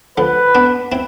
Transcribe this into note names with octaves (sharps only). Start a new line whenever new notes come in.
D3 F3 B4
B3 D4
C4 E4